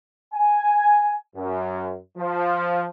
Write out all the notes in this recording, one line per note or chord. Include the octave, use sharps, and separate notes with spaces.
G#5
F#2
F3